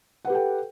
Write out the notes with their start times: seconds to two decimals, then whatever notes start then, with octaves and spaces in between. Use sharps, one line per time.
0.25 F#5
0.27 B4
0.30 G4
0.32 A4
0.35 G5